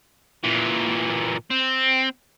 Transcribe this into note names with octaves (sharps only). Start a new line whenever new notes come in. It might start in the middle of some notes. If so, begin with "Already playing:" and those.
A#2 E3
C4